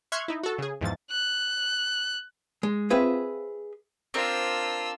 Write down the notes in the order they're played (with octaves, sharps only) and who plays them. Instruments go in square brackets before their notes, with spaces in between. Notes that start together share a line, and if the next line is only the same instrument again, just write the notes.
[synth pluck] E5 C6 C#6 F6 F#6 G#6
D#4 E4
F#4 A4
C#3 G#4
E2 G#2 F3 A6
[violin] F#6
[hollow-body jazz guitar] G#3
[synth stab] C4 F4 [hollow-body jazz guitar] G#4 B4 E5
[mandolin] C4 D4 A#4 [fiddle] F4 E6